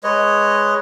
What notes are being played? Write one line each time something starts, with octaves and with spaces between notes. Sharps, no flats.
G#3 B4 C#5 D#5